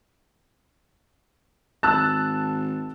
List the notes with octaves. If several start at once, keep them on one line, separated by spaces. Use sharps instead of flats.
G#1 A5 E6 F#6 A6